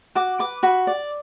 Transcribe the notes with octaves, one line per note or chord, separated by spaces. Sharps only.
F#4 D6
B4 D6
F#4 B5
D5